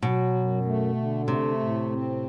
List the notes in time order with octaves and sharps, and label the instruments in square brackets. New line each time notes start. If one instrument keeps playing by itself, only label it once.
[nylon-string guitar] B2 [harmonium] F#3
[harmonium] F#2
A3
D3
[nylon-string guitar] C3 [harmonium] A3
[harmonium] A2
C4